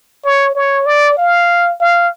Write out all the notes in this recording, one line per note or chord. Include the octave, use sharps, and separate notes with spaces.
C#5
C#5
D5
F5
F5